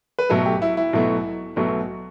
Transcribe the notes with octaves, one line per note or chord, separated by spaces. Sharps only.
B4
B1 B2 F#3 A3 A4
G4
E4
E4
B1 B2 F#3 A3
B1 B2 F#3 A3